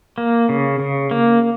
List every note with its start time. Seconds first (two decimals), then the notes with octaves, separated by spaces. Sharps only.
0.18 A#3
0.49 C#3
0.80 C#3
1.11 A#3